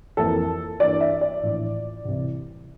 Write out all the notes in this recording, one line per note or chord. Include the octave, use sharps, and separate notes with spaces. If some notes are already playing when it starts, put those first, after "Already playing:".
F2 E3 A#3 A4
G2 E3 A#3 D5
E5
D5
A#1 A2 E3
C2 C3 E3